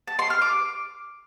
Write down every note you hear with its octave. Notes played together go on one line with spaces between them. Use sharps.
A5
C6
F6
D6